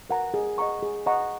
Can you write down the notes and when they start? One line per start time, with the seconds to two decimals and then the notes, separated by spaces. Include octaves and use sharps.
0.09 A#4 F#5 A#5
0.34 G#4
0.58 D#5 F#5 A#5 C#6
0.82 G#4
1.06 D#5 F#5 A#5 C#6